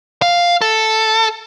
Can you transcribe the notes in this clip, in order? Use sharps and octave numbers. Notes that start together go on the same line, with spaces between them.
F5
A4